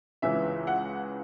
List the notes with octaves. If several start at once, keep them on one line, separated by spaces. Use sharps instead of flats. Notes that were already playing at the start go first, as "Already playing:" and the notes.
C#2 C#3 E3 E5
F#5